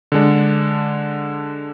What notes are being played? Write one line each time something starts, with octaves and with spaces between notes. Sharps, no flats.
D3 G#3 D4